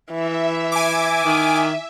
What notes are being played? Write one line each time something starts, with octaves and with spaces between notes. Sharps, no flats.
E3 E5
G#5 D6
D#3